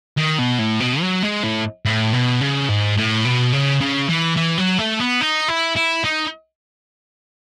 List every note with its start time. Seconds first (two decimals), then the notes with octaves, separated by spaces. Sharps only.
0.18 D#3
0.39 B2
0.59 A2
0.80 B2
1.01 F#3
1.23 G#3
1.43 A2
1.85 A2
2.13 B2
2.41 C#3
2.69 G#2
2.97 A2
3.25 B2
3.53 C#3
3.80 C#3
4.09 E3
4.37 E3
4.58 F#3
4.78 A3
5.00 B3
5.21 D#4
5.48 E4
5.76 E4
6.04 D#4